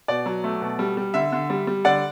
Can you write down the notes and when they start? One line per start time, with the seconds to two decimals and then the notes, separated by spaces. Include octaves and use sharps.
0.08 B2 D5
0.26 F#3
0.44 A3
0.61 B2
0.79 G3
0.97 G3
1.14 D3 E5
1.32 D3
1.50 G3
1.67 G3
1.85 D3 D5 F#5